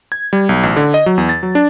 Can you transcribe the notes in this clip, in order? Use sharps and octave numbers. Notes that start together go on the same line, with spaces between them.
G#6
G3
B1
A1
D3
D#5
F#3
E2
A6
F#3
D4